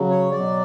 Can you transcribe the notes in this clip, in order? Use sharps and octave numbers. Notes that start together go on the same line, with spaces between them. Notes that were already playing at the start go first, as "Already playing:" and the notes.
Already playing: C#3 F#3
C#5
B2 F#3 D5